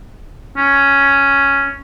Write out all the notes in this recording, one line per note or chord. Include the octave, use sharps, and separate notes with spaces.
C#4